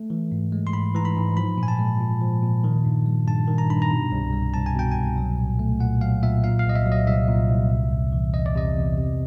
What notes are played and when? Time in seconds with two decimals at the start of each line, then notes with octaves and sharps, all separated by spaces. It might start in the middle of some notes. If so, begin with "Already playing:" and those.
Already playing: A3
0.10 E3
0.32 G#2
0.52 G#3
0.67 C6
0.73 G#2 B5
0.95 E3 A#5
1.05 B5
1.16 G#2
1.37 F3 B5
1.58 A#2
1.63 G#5
1.68 A5
1.79 G#3
2.00 A#2
2.21 F3
2.43 A#2
2.64 D#3
2.85 G2
3.06 G3
3.27 G2 A5
3.48 D#3
3.58 A#5
3.69 G2 B5
3.82 A#5
3.90 B2
4.12 C2
4.32 G3
4.54 C2 A5
4.66 G#5
4.75 B2 G5
4.92 C2 G#5
5.17 F#3
5.38 A#2
5.59 A3
5.80 A#2 F#5
6.01 F#3 F5
6.23 A#2 E5
6.44 A#2 F5
6.59 F5
6.65 C2 D#5
6.76 E5
6.86 F#3
6.92 D#5
7.07 C2 E5
7.28 A#2
7.49 C2
7.70 C3
7.91 E2
8.12 E3
8.34 E2 D#5
8.46 D5
8.56 C3 D#5
8.76 E2
8.98 C3